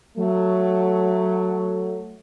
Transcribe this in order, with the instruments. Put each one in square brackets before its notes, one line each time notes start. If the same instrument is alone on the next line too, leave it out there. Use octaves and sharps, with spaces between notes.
[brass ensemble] F#3 A3